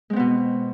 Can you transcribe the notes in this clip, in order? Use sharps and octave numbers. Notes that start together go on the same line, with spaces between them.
B2 G#3 B3 C4